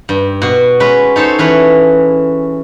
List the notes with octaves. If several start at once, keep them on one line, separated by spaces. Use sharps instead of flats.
G2
B2 F#4
G#3 C#4 B4
D#4 A4 C5 C#5
E3 C#4 B4 C#5